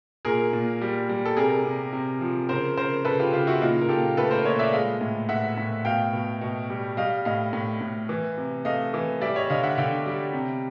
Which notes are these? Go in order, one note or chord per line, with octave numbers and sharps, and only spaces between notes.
A#2 G#4 A#4
A#2
G3
G3
A4
C3 G#4 A#4
C3
C3
F3
C#3 A#4 C5
C#3 A#4 C5
C#3 A4 B4
F4 G4
C#3 F4 G4
E4 F#4
A#2 D#4 F4
A#4
A#2 G4 A4
A3 A4 B4
A#4 C5
A#2 C#5 D#5
D5 E5
G#3 D#5 F5
A2
A2 E5 F#5
A2
B2 F5 G5
B2
B2
G3
G3 D#5 F5
A2 D#5 F5
A2
A2
E3
C3
A3 D#5 F5
E3
G3 D5 E5
C#5 D#5
D3 D#5 F5
E5 F#5
D3 F5 G5
G3
C3